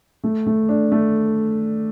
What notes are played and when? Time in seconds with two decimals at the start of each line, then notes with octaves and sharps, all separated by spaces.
0.24 A3
0.46 A3
0.69 D4
0.92 A3